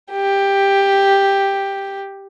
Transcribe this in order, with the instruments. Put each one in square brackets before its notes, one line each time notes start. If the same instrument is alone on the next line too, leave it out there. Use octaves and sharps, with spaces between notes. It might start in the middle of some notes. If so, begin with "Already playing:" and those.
[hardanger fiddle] G4